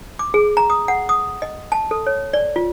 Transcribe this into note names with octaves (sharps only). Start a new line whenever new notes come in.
D6
G#4
A#5
D#6
F#5
D#6
D#5
A5
A4
C#5
D5
F4